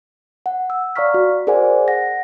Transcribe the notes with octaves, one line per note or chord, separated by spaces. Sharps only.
F#5
E6
D5 F5 A#5 C#6 F6 B6
F#4
G#4 A#4 C5 D5 F#5 G#5
F#5 A#6